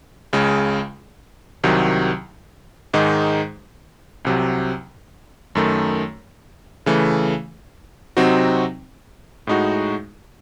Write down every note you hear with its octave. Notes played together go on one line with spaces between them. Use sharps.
C#2 C#3 G#3
C2 C3 D#3 F#3
G#2 D#3 G#3 D#4
C2 C3 F#3
F#2 D#3 A3
C#3 E3 A3
C3 F#3 C4 D#4 F#4
A2 G#3 D#4 F#4